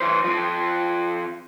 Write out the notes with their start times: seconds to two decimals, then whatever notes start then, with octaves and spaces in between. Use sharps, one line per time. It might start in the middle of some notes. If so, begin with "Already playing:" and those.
0.01 E3 C5
0.24 F3 C4